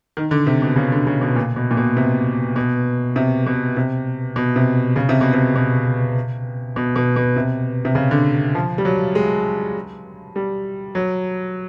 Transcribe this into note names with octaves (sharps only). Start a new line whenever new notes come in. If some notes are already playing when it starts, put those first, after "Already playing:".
D#3
D3
C3
B2
C#3
D3
C#3
B2
A#2
B2
A#2
B2
C3
B2
C3
B2
C3
B2
C3
C#3
C3
B2
C3
B2
B2
B2
B2
C3
C3
C#3
D3
F3
G3
F#3
G#3
G3
F#3